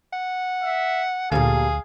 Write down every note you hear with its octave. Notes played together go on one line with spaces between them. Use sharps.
F#5
E5
D2 A#2 G3 G#4 A4 F5